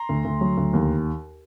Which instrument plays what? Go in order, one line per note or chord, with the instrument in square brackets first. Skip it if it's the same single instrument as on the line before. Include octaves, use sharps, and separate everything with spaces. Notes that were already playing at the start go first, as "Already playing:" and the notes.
Already playing: [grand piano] A#5 C6
D2
D2
F#3
D2
D#2